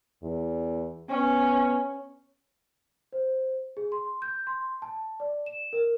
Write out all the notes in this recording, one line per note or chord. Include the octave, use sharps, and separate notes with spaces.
E2
B3 C#4
C5
G#4
C6
G6
C6
A5
D5
E7
A#4